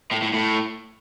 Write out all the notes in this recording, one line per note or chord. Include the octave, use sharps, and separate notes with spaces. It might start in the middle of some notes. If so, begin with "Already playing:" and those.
A2
A2
A2